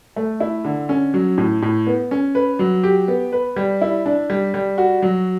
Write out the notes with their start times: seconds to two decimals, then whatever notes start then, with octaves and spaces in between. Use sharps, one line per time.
0.16 A3
0.40 E4
0.65 D3
0.89 C#4
1.14 F#3
1.38 A2
1.62 A2
1.87 B3
2.11 C#4
2.35 B4
2.59 F#3
2.83 G4
3.08 B3
3.33 B4
3.56 G3
3.81 E4
4.06 D4
4.30 G3
4.54 G3
4.78 F#4
5.02 F#3